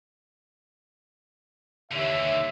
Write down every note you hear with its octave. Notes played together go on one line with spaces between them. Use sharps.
D#2 D3 E3 C#5 E5